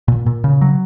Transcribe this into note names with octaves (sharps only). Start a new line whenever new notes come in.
A#2
A#2
C#3
F#3